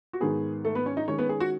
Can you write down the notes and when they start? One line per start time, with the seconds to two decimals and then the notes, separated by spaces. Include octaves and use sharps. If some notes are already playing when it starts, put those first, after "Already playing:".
0.13 F#4
0.20 G#2 D#3 G#3 B3 G#4
0.65 A3 A4
0.75 B3 B4
0.86 C#4 C#5
0.97 D#4 D#5
1.08 D#3 G#3 C#4 C#5
1.18 B3 B4
1.29 G#4
1.40 F#4